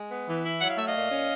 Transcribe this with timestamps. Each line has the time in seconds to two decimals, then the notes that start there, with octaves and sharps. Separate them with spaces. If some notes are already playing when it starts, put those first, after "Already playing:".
Already playing: G#3
0.11 B3
0.28 E3
0.44 E4
0.60 F#3 F#5
0.70 F5
0.78 A3 E5
0.86 D#5 F5
0.94 A#2
1.11 C#4